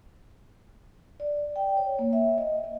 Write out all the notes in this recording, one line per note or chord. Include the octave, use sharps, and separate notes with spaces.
D5
G5
C#5
A#3
E5
D#5
D#5